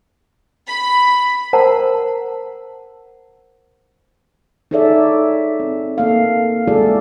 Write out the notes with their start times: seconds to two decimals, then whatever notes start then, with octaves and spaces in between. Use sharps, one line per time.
0.67 B5
1.53 A#4 C5 F#5 A5 A#5
4.71 D#4 G#4 A4 C#5 D5 E5
5.60 C4
5.98 A#3 A4 F5
6.68 G#3 E4 F#4 G#4 A4 D5